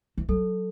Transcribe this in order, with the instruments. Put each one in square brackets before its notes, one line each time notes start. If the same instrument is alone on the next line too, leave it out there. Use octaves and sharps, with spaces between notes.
[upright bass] E3
[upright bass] F#3 [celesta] A4